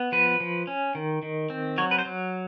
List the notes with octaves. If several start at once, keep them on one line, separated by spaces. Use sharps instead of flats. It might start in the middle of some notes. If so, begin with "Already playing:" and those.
Already playing: B3
F3 B4
F3
C#4
D#3
D#3
C4
F#3 C#5
B4
C5
F#3